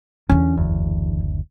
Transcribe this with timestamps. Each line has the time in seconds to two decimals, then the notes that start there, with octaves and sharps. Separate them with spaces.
0.29 E2 D3 C#4
0.57 F#1 D2